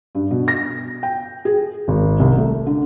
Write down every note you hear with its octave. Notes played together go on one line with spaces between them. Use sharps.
G2
B2
A#6
G5
G#4
G#1
C2
A3
D3